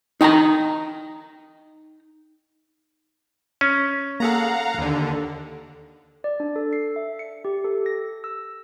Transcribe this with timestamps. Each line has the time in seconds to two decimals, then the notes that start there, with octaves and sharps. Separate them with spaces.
0.21 D#4 G5 G#5 A#5
3.61 C#4
4.20 A#3 G#4 A4 F5 F#5 A#5
4.78 D#2 D3
6.24 D5
6.40 D4
6.56 A4
6.73 C7
6.96 E5
7.19 C#7
7.45 G4
7.65 A4
7.86 A#6
8.24 E6